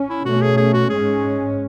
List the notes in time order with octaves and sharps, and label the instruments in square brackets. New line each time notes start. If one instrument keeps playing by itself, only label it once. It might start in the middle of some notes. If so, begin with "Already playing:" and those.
Already playing: [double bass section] C#4
[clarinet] E4
[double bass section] B2 A3 C#4 [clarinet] F#4
[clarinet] G#4
G#4
F#4
[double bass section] G#2 G#3 C#4 [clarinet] G#4